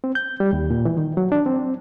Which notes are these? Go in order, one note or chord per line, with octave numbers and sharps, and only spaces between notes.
C4
G6
G3
D#2
A#2
E3
D#3
F#3
D4
C4